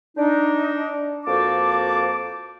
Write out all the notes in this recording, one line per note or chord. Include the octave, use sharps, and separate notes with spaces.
D4 D#4
F2 A#3 F#4 C5 A5 D6